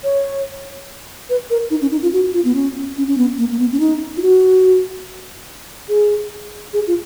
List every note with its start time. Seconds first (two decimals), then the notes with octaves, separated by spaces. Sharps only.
0.04 C#5
1.30 B4
1.50 A#4
1.71 D#4
1.82 C#4
1.92 D#4
2.03 F4
2.13 F#4
2.34 F4
2.45 B3
2.55 C#4
2.97 C#4
3.08 C#4
3.18 B3
3.38 A#3
3.51 A#3
3.59 B3
3.72 C#4
3.80 D#4
4.17 F4
4.22 F#4
5.89 G#4
6.73 G#4
6.87 F4